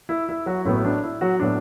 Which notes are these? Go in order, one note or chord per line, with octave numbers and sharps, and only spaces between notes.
E4
E4
F#3 F#4
A1 A2 F#3 B3 E4
D4
E4
F#3 F#4
A2 F#3 B3 D4